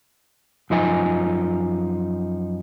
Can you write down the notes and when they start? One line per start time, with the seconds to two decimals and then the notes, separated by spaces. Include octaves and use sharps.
0.70 F#2 F3 D#4 G#5